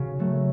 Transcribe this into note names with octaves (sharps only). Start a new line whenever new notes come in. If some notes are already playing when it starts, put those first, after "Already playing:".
Already playing: C#3 F#4
F#3 A3